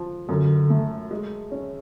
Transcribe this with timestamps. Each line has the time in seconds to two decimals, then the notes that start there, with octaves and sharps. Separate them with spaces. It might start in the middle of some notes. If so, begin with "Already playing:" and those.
Already playing: F3
0.29 F#2 D3
0.70 A3
1.11 G#3
1.52 C#4